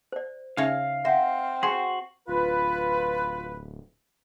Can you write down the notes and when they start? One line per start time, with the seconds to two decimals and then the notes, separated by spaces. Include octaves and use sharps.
0.12 C5 D5
0.57 C#3 C#4 D#4 C#5 E5 F5
1.05 C4 C5 E5 F#5
1.63 F#4 G#4 C5 F#5 C6
2.28 D1 F4 B4